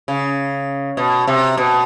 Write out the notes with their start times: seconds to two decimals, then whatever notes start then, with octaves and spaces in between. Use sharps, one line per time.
0.08 C#3
0.97 B2
1.27 C3
1.57 B2